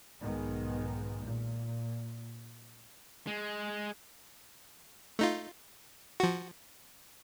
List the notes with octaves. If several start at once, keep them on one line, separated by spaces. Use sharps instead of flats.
B1 G#2 D#3 G#3 B3
A#2
G#3
A3 D#4 F4
F3 F#4